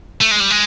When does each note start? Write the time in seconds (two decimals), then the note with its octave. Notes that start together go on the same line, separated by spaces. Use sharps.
0.21 A3
0.31 G#3
0.40 G3
0.50 G#3